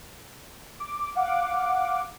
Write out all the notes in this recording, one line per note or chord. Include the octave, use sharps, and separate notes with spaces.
D6
F5 F#5 D6